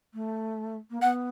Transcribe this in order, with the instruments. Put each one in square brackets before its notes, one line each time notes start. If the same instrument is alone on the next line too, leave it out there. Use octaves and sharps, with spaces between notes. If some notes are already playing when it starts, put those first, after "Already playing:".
[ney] A3
A#3
[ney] B3 [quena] F#5